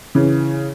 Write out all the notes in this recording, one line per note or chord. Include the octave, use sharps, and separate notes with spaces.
C#3 E3